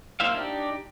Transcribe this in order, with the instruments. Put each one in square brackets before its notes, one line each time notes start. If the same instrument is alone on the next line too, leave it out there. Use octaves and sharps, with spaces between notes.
[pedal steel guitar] A#3 E4 C5 E5 F5
D4 D#4 G4